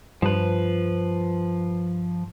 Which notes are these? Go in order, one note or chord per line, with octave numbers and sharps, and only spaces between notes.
G2 F3 B4